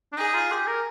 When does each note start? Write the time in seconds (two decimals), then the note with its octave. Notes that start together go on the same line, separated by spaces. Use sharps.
0.12 D4
0.17 D#4 G#4
0.34 F4
0.51 G4
0.67 A#4